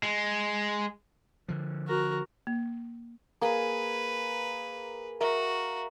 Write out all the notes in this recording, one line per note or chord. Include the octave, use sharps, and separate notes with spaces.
G#3
D3 F3
F#4 A#4
A#3
A#3 G#4 B4
F#4 A#4 E5